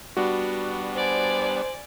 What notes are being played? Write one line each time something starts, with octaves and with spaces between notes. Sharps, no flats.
G3 B3 D4 F#4
C5 D5 G#5